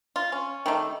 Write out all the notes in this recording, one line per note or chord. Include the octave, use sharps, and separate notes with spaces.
F4
C#4
D#3 G3 A3